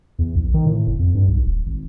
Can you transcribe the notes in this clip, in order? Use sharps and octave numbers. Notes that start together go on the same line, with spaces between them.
E2
A#1
D#3
A2
F#1
F2
G2
B1
D#1
G#1